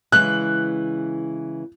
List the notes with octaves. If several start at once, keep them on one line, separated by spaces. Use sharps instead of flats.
C#3 E3 G#3 F#6